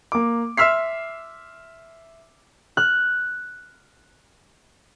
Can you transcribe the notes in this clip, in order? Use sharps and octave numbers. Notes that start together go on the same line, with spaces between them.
A#3 D6
E5 C6 E6 F6 B6 C7
F6 F#6